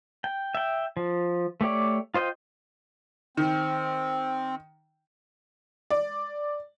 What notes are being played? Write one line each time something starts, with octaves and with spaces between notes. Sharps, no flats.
G5
E5 G5
F3
A3 G4 C#5 D5
F4 C5 D#5 F#5 G5
D#3 C4
D5